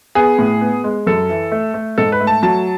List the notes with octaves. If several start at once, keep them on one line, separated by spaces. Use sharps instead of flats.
B3 G#4
A2
B3
G#3
F#2 A4
E3
A3
A3
G#2 A4
B4
A3
A5
F#3 A5